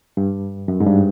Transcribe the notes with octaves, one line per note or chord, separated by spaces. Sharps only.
G2
F#2
G#2
G2